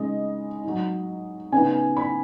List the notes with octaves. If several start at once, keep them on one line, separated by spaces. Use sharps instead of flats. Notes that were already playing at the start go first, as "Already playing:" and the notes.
Already playing: C#3 G#3 D#4 D#5
F#3 D#4
C#3 B3 D#4 G#5
B5